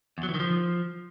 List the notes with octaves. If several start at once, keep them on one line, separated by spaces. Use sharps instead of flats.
E2
F#3
E3
D#3
F3